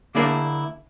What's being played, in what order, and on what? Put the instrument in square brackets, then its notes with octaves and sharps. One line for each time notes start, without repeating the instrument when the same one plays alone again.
[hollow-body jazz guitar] D3 A#3 D4 E4 G#4 A#4